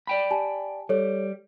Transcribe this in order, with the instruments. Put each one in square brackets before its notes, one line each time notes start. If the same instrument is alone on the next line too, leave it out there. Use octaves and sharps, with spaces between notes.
[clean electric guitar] D5 G5 B5
[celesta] G4 G#5 A5
[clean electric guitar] G3 [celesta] A4 C#5